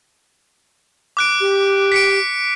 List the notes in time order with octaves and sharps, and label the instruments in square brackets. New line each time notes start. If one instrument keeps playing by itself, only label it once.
[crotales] D6 F#6 D7
[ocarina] G4
[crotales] B6 C#7 D7